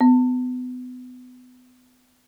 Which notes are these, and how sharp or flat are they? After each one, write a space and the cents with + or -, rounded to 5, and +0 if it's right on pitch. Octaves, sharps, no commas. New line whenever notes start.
B3 +30